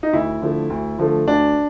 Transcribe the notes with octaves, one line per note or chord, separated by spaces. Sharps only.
D#4
D2 E4
D3 F3 A3
D2
D3 F3 A3
D2 D4